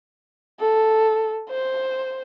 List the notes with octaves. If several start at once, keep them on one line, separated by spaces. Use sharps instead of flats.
A4
C5